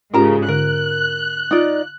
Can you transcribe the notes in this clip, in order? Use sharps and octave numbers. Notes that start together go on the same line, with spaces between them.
G#2 C#3 C#4 F4 G4 A#4 A#5
D3 A#4 F#6
D#4 F4 D5